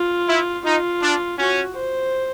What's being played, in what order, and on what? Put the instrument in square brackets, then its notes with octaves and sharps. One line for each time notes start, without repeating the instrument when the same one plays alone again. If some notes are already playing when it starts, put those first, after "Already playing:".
Already playing: [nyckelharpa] F4
[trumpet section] E4
[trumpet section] D#4 [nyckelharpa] F4
[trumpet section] D4
[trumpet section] C#4 [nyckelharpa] F#4
[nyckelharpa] C5